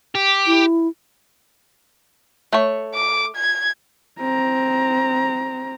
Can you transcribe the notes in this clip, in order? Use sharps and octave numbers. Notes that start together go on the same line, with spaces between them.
G4
E4
A3 C#5
D6
G#6
C4 A#5